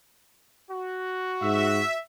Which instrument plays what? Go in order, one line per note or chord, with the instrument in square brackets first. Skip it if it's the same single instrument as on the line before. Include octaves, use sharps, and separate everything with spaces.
[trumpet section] F#4
[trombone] G#2 [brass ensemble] E5